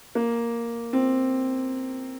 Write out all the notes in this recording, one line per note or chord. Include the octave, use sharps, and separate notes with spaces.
A#3
C4